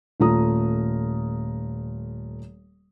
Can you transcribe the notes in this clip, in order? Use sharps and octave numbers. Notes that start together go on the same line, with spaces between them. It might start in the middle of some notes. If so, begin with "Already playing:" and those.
D#1 A3 F4 A#5 D#6